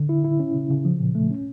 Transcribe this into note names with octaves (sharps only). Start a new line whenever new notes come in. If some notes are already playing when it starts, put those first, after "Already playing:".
Already playing: D3
E4
E4
C#4
C#3
C#3
F3
A#2
A3
C#4